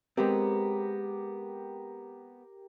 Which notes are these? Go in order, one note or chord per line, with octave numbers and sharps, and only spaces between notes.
G#3 B3 C4 G4 A#4